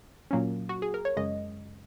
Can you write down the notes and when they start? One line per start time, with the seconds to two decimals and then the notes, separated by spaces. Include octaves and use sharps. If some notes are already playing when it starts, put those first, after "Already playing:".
0.31 A#2 F#3 A#3 C#4
0.69 F#4
0.82 G#4
0.94 A#4
1.05 C#5
1.17 F#2 C#3 G#3 D#5